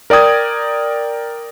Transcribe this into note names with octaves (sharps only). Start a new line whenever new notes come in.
A#4 D5 G5 D#6 G#6